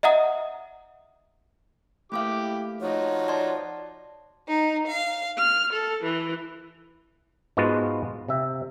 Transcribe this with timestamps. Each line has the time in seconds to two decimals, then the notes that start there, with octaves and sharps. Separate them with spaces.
0.03 D#5 E5 F#5 A#5 D#6
2.12 A3 A#3 E4 G4 F5 D6
2.81 F3 D#4 F#4 C#5
3.28 D5 A5 C6
4.48 D#4
4.87 F5
5.38 F6
5.73 A4
6.03 E3
7.57 G#2 G#3 B3 F4 F#4 A5
8.28 C3 E5